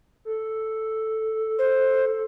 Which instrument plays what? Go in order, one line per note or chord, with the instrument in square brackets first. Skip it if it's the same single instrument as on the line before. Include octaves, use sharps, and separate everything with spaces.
[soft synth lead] A4
[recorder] C5